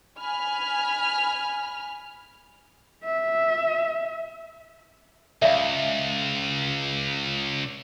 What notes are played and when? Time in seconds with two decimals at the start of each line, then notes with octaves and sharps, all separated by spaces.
0.18 G#5 B5 F6
3.05 E5
5.42 C#2 E5 F5